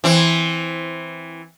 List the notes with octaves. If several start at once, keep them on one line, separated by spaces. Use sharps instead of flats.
E3 C4